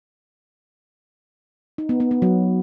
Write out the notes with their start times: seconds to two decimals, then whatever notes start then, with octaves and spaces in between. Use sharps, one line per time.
1.78 D#4
1.89 B3
2.00 B3
2.11 B3
2.22 F#3